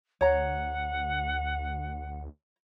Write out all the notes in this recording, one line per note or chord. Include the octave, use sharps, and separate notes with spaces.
D2 C#5 F#5 A#5